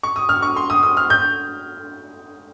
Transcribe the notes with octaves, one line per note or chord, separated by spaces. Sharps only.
C#6
D#6
F6
C#6
C6
D#6
D#6
F6
G6